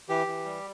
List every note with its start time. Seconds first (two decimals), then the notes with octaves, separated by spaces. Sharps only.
0.09 E3 G4
0.27 E3
0.45 G3